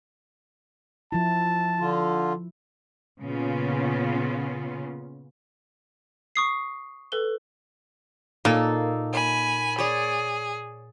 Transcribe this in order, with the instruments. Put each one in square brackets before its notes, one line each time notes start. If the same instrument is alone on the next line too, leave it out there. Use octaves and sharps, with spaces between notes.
[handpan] F3 E4 [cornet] A5
[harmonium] D3 F4
[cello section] A#2 C#3 B3 C#4 F4
[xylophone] C#6 D#6 C7
A4 B4 G7
[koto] A#2 [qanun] A#3 D#4 A4
[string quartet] G#5 B5
[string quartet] G#4 [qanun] C#5 D5